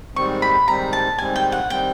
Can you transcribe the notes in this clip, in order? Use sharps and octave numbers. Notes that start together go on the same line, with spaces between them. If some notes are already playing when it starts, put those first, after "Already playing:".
G#2 D#3 G3 C4 C#6
B5
G#2 D#3 G3 C4 A#5
A5
G#2 D#3 G3 C4 G#5
G5
F#5
D#3 G3 C4 G5